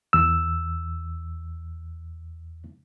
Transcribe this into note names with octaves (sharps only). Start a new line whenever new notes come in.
E2 E6